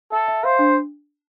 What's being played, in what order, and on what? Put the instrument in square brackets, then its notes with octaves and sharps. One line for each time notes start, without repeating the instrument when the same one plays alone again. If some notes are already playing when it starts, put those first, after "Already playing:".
[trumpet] A4 [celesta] E5
[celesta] E5
[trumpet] C5 [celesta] F5
[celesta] D4